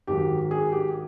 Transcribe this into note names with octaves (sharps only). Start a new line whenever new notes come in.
G#2 D#3 F#3 G4
G#4
G4